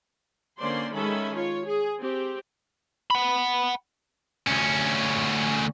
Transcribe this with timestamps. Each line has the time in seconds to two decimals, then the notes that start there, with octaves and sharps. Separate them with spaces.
0.59 D3 A#3 C#4 C5 D5 C6
0.93 D#3 G#3 C#4 A4 E5 B5
1.35 F4 C#5
1.66 G#4
1.99 C4 G4
3.10 F#5 B5
4.47 D2 C#4